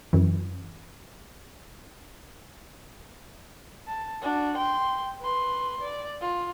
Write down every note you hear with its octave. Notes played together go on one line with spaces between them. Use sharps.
F#2 E3
A5
D4 F#4
G5 C6
B4 C6
D5
F4